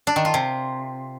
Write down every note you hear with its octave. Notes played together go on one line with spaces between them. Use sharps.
D4
D#3
F4
C3